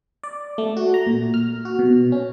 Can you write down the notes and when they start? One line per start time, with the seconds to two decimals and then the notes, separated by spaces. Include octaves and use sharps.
0.23 D5
0.58 A3
0.77 F#4
0.94 A#5
1.07 A#2
1.34 F6
1.65 F#4
1.79 B2
2.12 C#4